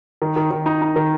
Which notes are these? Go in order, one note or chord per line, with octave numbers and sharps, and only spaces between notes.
D#3
D#3
D#3
D#4
D#4
D#3